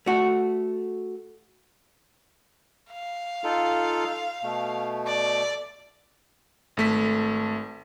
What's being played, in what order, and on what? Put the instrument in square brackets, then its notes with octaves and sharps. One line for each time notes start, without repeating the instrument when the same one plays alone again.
[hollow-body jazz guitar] A3 F#4
[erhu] F5
[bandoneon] D#4 F4 A4
B2 A3
[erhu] D5
[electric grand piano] G#1 A3 B6